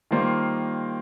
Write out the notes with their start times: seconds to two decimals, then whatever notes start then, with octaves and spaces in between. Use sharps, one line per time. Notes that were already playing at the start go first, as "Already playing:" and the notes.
0.11 D#3 G3 A#3 F4 C5